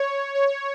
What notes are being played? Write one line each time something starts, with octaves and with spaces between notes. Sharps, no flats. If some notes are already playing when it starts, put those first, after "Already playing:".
Already playing: C#5
C#5